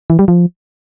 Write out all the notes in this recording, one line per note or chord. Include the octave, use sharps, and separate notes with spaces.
E3
G3
F3